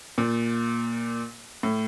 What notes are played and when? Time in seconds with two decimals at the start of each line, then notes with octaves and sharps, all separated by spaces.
0.18 A#2
1.63 A2